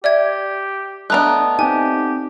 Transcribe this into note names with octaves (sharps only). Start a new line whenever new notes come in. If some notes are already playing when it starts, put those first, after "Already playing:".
G4 D5 E5 G#6
A3 B3 D4 D#5 A#5 F#6
C4 D#4 G4 G#5